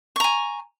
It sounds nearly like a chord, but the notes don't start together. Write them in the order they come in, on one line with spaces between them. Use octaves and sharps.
C#6 A#5 G#5